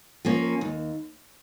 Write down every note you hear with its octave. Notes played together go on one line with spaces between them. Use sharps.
F3 A#3 C#4
D#2